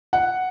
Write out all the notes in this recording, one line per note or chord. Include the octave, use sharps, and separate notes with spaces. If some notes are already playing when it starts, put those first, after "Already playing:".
F#5